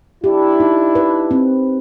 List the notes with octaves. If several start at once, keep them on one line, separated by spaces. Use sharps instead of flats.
D4 E4 G4
D#4
B4
C4